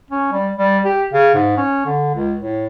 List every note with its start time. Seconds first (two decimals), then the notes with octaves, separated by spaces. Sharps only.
0.11 C#4
0.32 G3
0.56 G3
0.85 G4
1.13 C#3
1.35 G#2
1.57 C#4
1.86 D3
2.15 C#2
2.40 A2